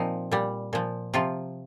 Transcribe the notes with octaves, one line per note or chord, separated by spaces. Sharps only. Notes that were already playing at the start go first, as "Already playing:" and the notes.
Already playing: A#2 F3 C4 D#4
A#2 G3
A#2 F3
C3 F3 F4